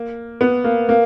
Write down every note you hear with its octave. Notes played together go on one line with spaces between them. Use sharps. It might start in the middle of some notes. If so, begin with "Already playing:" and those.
Already playing: A#3
B3
A#3
A#3